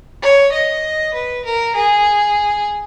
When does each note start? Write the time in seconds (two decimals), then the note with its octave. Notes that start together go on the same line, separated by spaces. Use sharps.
0.23 C#5
0.52 D#5
1.14 B4
1.45 A#4
1.75 G#4